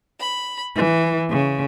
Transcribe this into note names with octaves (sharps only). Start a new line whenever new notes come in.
B5
E3
C#3